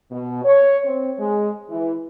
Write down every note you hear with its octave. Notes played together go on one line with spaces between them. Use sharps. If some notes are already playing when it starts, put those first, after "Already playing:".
B2
C#5
C4
G#3
E3